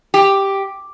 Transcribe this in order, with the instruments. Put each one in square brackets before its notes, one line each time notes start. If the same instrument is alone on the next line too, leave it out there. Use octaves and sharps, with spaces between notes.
[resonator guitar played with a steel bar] G4